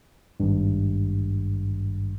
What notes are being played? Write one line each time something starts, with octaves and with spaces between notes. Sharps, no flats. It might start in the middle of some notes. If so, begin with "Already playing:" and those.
G#1 G2